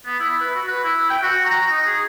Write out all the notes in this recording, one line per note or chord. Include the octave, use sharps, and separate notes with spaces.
B3
E4
B4
F#4
B4
E4
G5
F#4
A#5
D#4
G#4